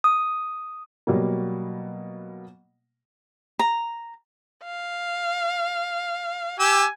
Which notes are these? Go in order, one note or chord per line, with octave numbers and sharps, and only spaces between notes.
D#6
B2 F#3 G3 A#3
A#5
F5
G4 G#5 E6